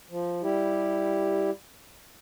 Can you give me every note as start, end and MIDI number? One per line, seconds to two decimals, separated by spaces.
0.10 0.42 53
0.42 1.50 55
0.42 1.50 64
0.42 1.50 67